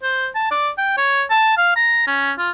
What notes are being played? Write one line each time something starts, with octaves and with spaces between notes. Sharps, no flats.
C5
A5
D5
G5
C#5
A5
F5
A#5
C#4
F4